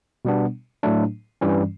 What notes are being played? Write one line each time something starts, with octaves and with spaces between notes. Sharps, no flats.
B2 G3 B3 D4
A2 F#3 A3 D4
G2 E3 G3 C#4